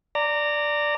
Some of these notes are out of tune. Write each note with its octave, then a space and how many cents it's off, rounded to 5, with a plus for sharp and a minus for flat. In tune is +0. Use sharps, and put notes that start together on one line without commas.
D5 +0 A#5 -20